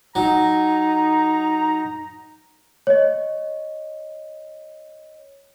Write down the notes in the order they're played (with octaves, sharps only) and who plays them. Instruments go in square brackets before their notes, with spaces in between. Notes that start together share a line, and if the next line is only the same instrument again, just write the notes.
[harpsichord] F#3 [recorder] D#4 [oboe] A#5
[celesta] C#5 D#5